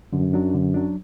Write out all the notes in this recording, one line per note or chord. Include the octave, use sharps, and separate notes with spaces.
F#2 D3
F#3 D4
D3
F#3 D4